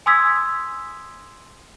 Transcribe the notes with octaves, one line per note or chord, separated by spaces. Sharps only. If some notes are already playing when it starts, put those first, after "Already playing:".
G#5 C6 D#6 E6 G#6 B6